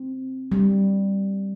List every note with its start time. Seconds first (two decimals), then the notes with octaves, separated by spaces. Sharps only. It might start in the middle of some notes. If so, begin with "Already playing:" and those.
Already playing: C4
0.52 G3